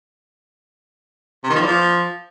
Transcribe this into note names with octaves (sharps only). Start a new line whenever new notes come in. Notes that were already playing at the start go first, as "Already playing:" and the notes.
C3
D#3
F3
E2
F3